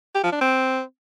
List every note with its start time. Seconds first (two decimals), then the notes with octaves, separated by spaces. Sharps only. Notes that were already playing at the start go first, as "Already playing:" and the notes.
0.15 G4
0.23 F3
0.32 D4
0.41 C4